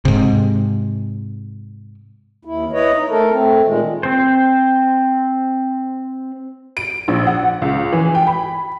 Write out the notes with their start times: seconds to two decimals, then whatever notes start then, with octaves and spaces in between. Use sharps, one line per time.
0.05 G#2 C3
2.45 D#2 E4
2.73 E4 B4 C#5 D#5
2.96 D#4
3.10 A3 A4 A#4
3.31 A3 C4
3.65 A#2 D#3 G#3
4.03 C4 C5
6.77 D7
7.08 A#1
7.27 F#5
7.62 C#2
7.92 E3
8.15 G5
8.27 B5